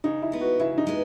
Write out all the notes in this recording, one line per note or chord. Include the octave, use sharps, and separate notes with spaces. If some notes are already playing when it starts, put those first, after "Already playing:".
C#3 D#4
E4
G#3 B3
F#4
C#3 E4
D#4
G#3 B3